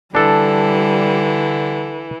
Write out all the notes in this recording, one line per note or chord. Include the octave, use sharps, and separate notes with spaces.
D3 E3 G3 D4 A4